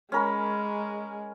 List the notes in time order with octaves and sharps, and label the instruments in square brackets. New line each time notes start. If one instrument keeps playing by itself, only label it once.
[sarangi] G#3 [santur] C#4 A#4 B5